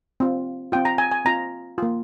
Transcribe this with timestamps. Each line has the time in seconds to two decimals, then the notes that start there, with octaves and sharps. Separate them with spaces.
0.20 C4 F4
0.72 C4 F4 G5
0.85 A#5
0.98 G#5
1.11 G#5
1.25 C4 F4 A#5
1.78 A#3 F4